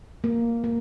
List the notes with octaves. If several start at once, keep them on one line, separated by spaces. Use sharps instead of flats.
A#3
A#3